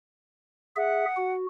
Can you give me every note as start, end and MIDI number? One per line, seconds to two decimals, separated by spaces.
0.76 1.05 68
0.76 1.05 76
0.76 1.32 78
1.17 1.47 66